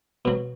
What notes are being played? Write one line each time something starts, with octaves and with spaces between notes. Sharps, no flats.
B2 F#3